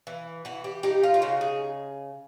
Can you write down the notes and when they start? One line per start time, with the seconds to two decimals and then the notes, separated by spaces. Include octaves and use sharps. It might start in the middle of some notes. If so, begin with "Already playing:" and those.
0.07 E3
0.45 E3 F#4
0.64 G4
0.83 D#4 G4
1.03 F4
1.14 F4
1.22 C#3 F#4
1.41 G#4